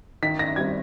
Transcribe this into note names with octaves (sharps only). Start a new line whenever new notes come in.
D#3 B6
A#6
G3 C4 G#6